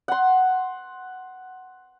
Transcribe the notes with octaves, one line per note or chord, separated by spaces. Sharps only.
F#5 C6